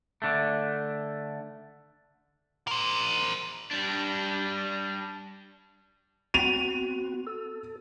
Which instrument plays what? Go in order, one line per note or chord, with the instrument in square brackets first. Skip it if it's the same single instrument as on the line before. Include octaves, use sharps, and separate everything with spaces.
[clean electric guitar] D3 A3
[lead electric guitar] A#4 C5
[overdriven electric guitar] G3 D4
[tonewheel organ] B3 C4 F#4 [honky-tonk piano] D#7 F7
[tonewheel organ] A4